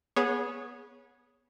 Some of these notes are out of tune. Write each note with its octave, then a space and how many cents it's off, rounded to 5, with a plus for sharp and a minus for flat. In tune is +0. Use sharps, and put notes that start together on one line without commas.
B3 -20 G#4 +0 C#5 +0